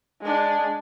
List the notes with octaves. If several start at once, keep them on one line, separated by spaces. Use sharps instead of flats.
G#3 D4